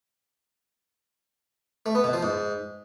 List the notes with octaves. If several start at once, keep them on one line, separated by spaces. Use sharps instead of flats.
A3
B3
B2
F3
G#2